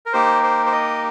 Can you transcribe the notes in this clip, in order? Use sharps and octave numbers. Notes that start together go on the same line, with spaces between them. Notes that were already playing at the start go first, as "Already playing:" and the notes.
A#4
A#3 D#4 G4 C5
C5
C5
D#5